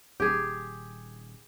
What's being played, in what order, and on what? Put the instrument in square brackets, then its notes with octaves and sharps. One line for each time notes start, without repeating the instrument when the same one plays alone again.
[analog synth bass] D#1 [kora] G4 G#4